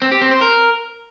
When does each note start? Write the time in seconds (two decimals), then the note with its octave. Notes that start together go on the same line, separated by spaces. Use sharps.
0.02 C4
0.12 G4
0.21 C4
0.31 C5
0.41 A#4